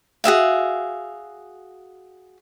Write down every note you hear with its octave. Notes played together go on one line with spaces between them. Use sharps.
F#4 G#4 E5 F5